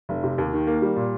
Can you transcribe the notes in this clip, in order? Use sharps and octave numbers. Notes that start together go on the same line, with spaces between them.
F1
C3
D#2
D#3
A#3
G3
A#2